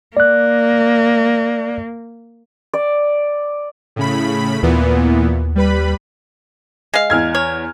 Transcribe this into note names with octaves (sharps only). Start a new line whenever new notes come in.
A#3 D5 F#6
D5
A2 C#3 B5
D#2 A#2 E3 B3
G3 B4 B5
G#3 F5
E2 F6 G#6
C#5